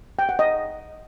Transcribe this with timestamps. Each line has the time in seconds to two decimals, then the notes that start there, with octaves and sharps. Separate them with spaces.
0.19 G5
0.29 F#5
0.39 D#5